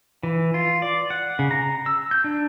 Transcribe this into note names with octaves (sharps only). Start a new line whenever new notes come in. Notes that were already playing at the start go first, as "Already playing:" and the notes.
E3
F4
D5
F#5
C#3
A#5
E6
G6
D4